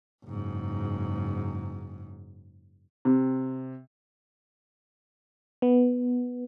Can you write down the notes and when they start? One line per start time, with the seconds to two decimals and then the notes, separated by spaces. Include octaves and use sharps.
0.24 F#1 G#2
3.05 C3
5.62 B3